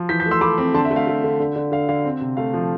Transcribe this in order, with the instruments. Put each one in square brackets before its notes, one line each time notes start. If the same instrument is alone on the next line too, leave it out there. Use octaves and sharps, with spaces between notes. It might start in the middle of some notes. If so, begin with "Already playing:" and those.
Already playing: [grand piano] F3
E3 G6 B6
G6 B6
A3
C6 E6
A3 B5 D6
C4
D3 A5 C6
E5
A3
F5
A3
D3
D3
D3
D3 F5
D3 F5
C4
C3
A3 F5
F3